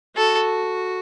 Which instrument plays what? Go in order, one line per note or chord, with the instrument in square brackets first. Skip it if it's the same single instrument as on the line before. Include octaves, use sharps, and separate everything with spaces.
[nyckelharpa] F#4 [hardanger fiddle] A4